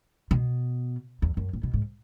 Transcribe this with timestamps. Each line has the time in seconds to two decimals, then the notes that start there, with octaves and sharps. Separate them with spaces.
0.31 B2
1.22 E2
1.37 F#2
1.53 A2
1.63 B2
1.73 G#2